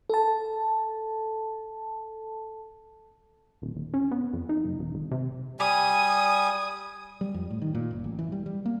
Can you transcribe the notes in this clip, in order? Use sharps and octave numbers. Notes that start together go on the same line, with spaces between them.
A4 A5
D#1
D#1
C#4
B3
F2
D#4
F#1
E1
G#1
C3
G3 G#5 D#6
G3
F2
A2
D#3
A#2
F#1
A1
E3
G3
G3
A#3